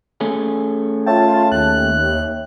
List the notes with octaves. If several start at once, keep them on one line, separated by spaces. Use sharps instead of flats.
A3 C#4 G#4
F4 C#5 E5 G5 A5
D#2 F#6